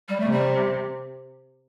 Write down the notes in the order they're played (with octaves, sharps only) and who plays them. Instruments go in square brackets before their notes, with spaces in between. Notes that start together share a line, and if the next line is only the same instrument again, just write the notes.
[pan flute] G3
A3
[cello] C3
[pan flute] G3